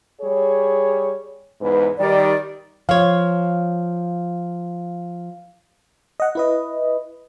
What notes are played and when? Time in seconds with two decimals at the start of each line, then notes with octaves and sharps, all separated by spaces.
0.21 G3 G#4 C#5
1.61 E2 G#2 B4
1.99 D#3 G3 D5
2.89 F3 C#5 F5
6.20 D#5 F#5
6.35 E4 B4 D#5